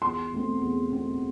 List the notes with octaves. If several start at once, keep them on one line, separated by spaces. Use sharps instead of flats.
E2 C6
B2 A3 C4
E2
B2 A3 C4